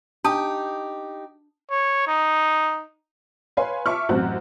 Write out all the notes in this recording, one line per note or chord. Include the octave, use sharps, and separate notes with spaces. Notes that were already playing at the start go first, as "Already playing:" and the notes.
D4 D#4 G4 A5 D#6
C#5
D#4
B4 C#5 F5 G#5 C6
E5 A5 C#6 D6 F6
A1 F#2 C4 C5 F#5 F#6